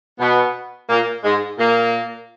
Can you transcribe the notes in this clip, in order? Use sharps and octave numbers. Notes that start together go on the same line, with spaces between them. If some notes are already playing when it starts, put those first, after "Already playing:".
B2 B3
A#2 A#3
G#2 G#3
A#2 A#3